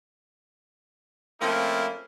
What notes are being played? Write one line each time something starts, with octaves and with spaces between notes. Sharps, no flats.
F3 A3 A#3 C4 C#4 E4